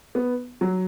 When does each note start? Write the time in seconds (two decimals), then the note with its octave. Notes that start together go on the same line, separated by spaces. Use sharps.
0.15 B3
0.61 F#3